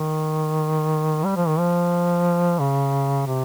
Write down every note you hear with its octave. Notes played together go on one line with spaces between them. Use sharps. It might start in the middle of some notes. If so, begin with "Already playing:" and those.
Already playing: D#3
G3
F3
D#3
F3
C#3
C3